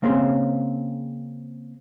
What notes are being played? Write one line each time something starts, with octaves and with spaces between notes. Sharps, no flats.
C#3 A#3 C4 C#4 G#4 C6